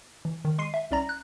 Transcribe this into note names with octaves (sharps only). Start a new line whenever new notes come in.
E3
D#3
G#3 C6 C7 D#7
E5
C2 C#4 D5 A#5 A#6
F#6